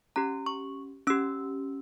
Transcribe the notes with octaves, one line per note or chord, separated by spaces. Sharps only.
C#4 G4 A#5
C#6
C#4 G4 E6